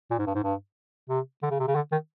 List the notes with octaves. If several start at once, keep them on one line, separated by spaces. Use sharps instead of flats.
A#2
G#2
G2
G#2
G2
C3
D3
C#3
C3
C#3
D3
D#3